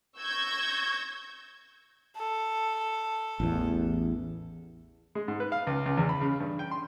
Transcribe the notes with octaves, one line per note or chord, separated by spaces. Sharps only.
C#6 E6 G6 G#6 A#6
A4
A1 E2
G#3
G#2
B4
F5
C#2
C#2
E2
B5
C#3
G2
G5
C6